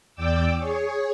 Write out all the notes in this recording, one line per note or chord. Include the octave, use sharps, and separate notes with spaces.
E2 D5 G5 D6 E6
G#4 C#5